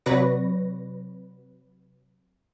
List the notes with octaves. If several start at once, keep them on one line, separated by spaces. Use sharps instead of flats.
C3 F#3 B4 D5 C#6 A#6